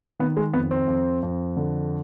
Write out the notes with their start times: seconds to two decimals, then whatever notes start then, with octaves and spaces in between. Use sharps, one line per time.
0.19 D#3 B3
0.37 G#3
0.54 F2 B3
0.71 C4
0.88 F2
1.23 F2
1.57 D3